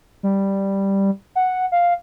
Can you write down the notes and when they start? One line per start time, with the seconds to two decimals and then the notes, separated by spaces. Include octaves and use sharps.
0.23 G3
1.35 F#5
1.72 F5